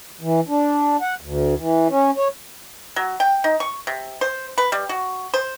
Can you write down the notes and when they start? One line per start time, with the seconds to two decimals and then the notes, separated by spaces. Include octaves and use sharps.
0.21 E3
0.48 D4
1.01 F#5
1.21 D2
1.57 E3
1.89 C#4
2.17 C#5
2.96 F#3
3.20 G5
3.44 D#4
3.60 C#6
3.87 C3
4.21 C5
4.58 B4
4.72 G3
4.89 F#4
5.34 C5